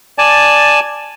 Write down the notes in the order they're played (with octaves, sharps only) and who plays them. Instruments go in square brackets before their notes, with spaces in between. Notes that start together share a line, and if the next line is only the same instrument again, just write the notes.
[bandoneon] D5 G#5 A5